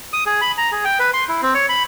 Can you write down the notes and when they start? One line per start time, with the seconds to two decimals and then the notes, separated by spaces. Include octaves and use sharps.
0.13 D#6
0.26 G#4
0.41 B5
0.58 A#5
0.72 G#4
0.85 G5
1.00 B4
1.13 C6
1.29 E4
1.42 C4
1.55 C#5
1.69 B5